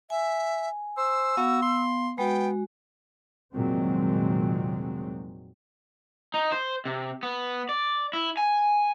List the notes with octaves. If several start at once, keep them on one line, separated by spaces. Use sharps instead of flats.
E5 G#5
C5 E6
B3 F#4 F5
C6
G#3 B3 F#4 G5
F1 A#2 D#3 F#3 G#3 C4
D#4
C5
C3
B3
D5
E4
G#5